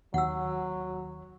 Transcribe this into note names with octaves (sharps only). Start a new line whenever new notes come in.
D#2 F#3 F#5 E6